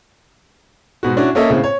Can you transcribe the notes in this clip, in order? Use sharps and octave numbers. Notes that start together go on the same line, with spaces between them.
G#2 B2 F#4
C#4 D4 E4 F#4
A#3 C#4 A4 D#5 E5
A2 C#3 C4
C#5